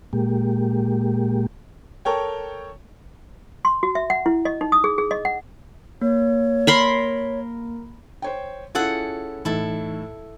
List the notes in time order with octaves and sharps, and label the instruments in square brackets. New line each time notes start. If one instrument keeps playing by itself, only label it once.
[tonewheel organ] A#2 G#3 A#3 G4
[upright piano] A4 A#4 C#5 G5
[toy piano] C6
F#4
E5
F#5
E4
D#5
D#4
D#6
G#4
G#4
D#5
F#5
[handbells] A#3 [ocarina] C#5
[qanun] A#4 B5 C6
[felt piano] C5 C#5 G5
[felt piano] C#4 E4 [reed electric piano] F4 [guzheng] G#4 A4 F#5
[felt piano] A2 [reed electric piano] E3 D#4 [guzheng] E4 A4